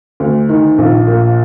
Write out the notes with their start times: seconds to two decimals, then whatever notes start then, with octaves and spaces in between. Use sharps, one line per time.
0.20 D2
0.49 D#3
0.78 A#1
1.07 A#2